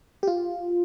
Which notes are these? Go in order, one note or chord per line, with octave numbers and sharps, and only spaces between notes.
G4
F4